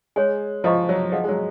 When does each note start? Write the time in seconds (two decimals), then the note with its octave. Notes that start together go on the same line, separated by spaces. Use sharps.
0.16 G#3 G#4 C#5 G#5
0.64 F3 F4 C5 D#5 A#5 C#6
0.89 F#3
1.12 F3 G#4 D#5 F#5
1.24 G#3
1.28 F#3